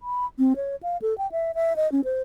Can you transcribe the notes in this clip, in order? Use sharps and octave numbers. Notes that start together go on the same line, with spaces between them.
B5
C4
C#5
F5
A4
G5
E5
E5
D#5
C#4
C5